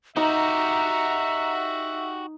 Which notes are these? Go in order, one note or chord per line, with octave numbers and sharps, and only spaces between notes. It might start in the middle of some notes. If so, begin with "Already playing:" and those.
D#4 F#4 G4 E5 A#5